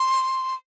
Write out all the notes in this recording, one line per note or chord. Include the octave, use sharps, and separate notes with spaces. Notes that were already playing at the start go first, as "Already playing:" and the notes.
Already playing: C6